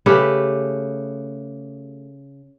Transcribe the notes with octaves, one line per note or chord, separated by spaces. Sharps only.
C#3 A3 G4 B4